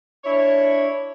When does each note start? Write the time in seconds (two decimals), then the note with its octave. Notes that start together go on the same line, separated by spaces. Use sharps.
0.25 D4 E4 C#5